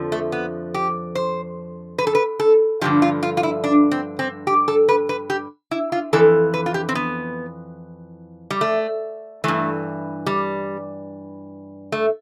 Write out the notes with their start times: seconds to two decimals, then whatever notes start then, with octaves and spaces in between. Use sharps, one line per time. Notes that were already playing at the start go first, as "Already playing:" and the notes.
Already playing: F2 D3 F3
0.12 A3
0.32 B3
0.74 G4
1.15 C5
1.98 B4
2.07 A4
2.15 B4
2.40 A4
2.81 G2 D3 F3 G4
3.02 F4
3.23 F4
3.37 F4
3.43 E4
3.64 D4
3.91 C4
4.19 C4
4.47 G4
4.68 A4
4.89 B4
5.09 B4
5.30 G4
5.71 E4
5.92 F4
6.13 F2 E3 A4
6.54 B4
6.66 F4
6.74 G4
6.89 C4
6.95 B3
8.50 G3
8.61 A3
9.44 G2 E3 A3
10.26 G3
11.92 A3